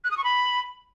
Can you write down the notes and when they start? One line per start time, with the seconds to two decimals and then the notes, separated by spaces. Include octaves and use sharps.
0.04 F#6
0.11 D#6
0.17 C#6
0.24 B5